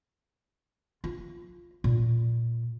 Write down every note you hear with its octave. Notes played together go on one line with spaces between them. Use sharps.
F4
A#2